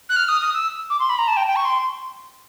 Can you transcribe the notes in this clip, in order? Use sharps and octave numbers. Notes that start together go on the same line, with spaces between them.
F#6
F6
D#6
D#6
E6
D6
C6
B5
A#5
A5
G5
G5
C#6
C6